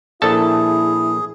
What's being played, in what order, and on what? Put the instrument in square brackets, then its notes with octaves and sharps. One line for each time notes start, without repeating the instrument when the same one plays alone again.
[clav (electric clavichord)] A#1 A4 A5 [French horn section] E4 [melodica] G#4